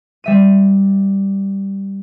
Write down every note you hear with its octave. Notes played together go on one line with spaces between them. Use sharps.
G3 E5 D#7